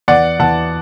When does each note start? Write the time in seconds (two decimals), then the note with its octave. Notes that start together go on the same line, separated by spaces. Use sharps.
0.08 E2 D5 F#5
0.39 E2 F#5 A5